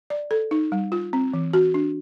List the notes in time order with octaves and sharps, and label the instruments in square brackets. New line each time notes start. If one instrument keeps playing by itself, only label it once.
[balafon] D5
A4
D#4
G3
F4
C4
E3
F#4
D4